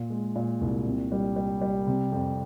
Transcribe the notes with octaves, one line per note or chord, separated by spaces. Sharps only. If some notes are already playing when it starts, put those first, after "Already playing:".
Already playing: A#2
G#3
A#2
C2
C3
G3
G3
G3
C3
F2